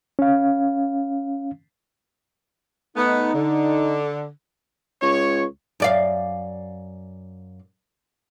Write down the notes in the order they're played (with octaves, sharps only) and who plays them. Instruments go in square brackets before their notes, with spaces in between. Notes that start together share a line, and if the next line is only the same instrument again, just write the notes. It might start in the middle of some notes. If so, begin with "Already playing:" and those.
[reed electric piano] C#4 F5
[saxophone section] A3 B3 [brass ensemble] D#4
[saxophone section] D3
[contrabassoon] C#2 [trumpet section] C#5
[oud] F#2 D5 F5